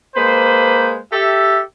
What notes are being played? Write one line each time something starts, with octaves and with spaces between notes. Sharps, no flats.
G#3 A#3 B4 C5
G4 A4 E5